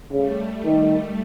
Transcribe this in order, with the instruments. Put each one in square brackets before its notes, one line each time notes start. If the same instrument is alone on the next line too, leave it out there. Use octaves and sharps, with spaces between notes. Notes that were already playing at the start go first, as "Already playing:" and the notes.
[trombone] C#3 [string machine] G3 A3
[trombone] D#3 [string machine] G3 A3